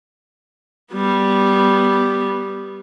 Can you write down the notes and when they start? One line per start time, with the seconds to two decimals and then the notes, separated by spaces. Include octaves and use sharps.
0.93 G3 B3